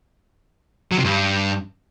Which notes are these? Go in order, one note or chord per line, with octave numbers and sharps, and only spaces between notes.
F#3
C3
G2